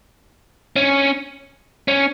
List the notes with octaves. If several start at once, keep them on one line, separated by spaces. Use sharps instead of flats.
C#4
C#4